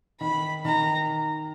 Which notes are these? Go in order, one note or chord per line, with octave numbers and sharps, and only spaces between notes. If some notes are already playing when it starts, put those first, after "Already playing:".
D#3 B5
D#3 A#5